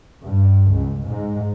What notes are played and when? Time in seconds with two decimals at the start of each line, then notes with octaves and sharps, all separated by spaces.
0.25 G2
0.74 C#2
1.07 G#2